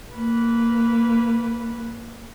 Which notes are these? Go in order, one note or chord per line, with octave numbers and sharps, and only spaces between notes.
A#3 B4